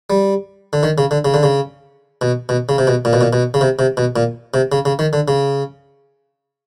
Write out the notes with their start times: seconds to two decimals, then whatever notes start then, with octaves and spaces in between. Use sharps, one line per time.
0.10 G3
0.73 D3
0.83 D#3
0.98 C#3
1.11 D3
1.25 C#3
1.34 D3
1.43 C#3
2.22 B2
2.49 B2
2.69 C#3
2.78 C3
2.87 B2
3.05 A#2
3.13 B2
3.21 A#2
3.33 B2
3.54 C#3
3.61 C3
3.79 C3
3.97 B2
4.16 A#2
4.54 C3
4.72 C#3
4.85 C#3
4.99 D#3
5.13 D3
5.28 C#3